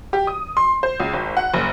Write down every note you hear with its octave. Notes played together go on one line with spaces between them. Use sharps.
G4
D#6
C6
C5
C#2
G#1
F#5
F#1